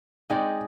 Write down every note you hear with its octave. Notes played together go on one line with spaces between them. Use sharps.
G#3 C4 D#4 G#4 D5 G5